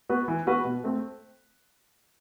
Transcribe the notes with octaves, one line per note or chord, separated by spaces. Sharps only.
B3 F#4 B4
E3
B3 F#4 B4
B2
A3 C4